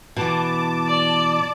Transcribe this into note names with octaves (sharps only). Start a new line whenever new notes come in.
B2 E3 A5 D6
D5